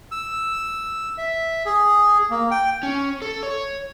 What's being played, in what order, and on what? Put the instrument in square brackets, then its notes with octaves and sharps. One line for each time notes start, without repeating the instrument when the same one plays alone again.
[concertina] E6
E5
G#4
A#3
G5
[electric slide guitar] C#4
A4
C#5